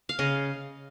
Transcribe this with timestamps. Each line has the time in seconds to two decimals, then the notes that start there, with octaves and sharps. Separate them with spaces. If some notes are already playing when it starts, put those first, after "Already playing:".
0.09 F5
0.19 C#3 D#5